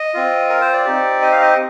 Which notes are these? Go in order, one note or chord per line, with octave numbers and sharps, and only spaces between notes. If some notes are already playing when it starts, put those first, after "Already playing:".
Already playing: D#5
C4 F4
A#4
C5
D5
C4 D#4 G4
D#5
F5
D#5